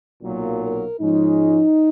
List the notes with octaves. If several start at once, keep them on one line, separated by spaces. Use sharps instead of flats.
B1 A#2 F#3 A#3
A#4
G#2 F3 G#3 C#4 D#4